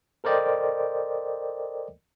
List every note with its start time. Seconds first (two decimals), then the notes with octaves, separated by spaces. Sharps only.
0.24 A4 A#4 C5 D5 D#5 G5